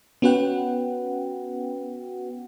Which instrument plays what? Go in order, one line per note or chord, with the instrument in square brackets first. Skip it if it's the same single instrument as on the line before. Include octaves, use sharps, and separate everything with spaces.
[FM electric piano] B3 C#4 F#4 B4 F#5 G5